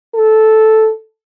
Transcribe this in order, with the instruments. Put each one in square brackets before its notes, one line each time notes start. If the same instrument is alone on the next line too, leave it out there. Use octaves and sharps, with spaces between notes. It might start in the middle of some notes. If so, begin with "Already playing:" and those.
[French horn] A4